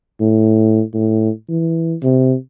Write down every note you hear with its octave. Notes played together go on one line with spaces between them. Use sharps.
A2
A2
E3
C3